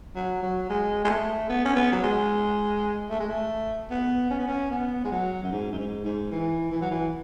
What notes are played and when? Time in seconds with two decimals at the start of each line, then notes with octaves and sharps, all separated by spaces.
0.15 F#3
0.43 F#3
0.69 G#3
1.04 G#3
1.09 A3
1.49 B3
1.65 C#4
1.76 B3
1.92 F#3
2.03 G#3
3.10 A3
3.20 G#3
3.29 A3
3.91 B3
4.30 C#4
4.39 B3
4.48 C#4
4.71 B3
5.04 G#3
5.11 F#3
5.43 F#2
5.51 G#2
5.72 F#2
5.78 G#2
6.05 G#2
6.31 E3
6.72 E3
6.81 F#3
6.91 E3